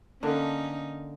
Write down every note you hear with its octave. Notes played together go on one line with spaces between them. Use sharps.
D3 A#3 C#4 D#4